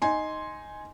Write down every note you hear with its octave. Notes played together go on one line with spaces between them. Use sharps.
D#4 G#5 C6